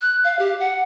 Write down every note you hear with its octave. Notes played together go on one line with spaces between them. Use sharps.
F#6
F5
G4
F#5